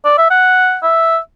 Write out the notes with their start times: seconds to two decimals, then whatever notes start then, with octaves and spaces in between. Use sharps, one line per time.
0.05 D5
0.18 E5
0.31 F#5
0.83 E5